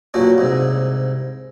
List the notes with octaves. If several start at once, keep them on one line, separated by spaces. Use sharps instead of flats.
G2 A#2 F#3 C#4
C2 G#2